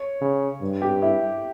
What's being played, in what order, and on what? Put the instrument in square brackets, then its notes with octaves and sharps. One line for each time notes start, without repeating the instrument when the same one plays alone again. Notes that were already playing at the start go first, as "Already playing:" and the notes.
Already playing: [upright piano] C#5
[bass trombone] C#3
G2
[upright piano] G4
E4